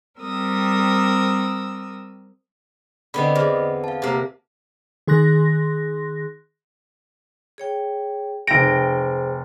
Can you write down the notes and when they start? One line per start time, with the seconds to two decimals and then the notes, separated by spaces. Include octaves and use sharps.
0.20 G3 C4 A#4 D#6 E6
3.14 D3 B3 C4 D#5 B5
3.35 E2
3.84 F5 A5
4.02 C3 A#3
5.07 D#3 G#4 C6 F#6 A#6
7.58 G#4 C#5 G5
8.47 F1 G#4 C5 G5 A#6 D7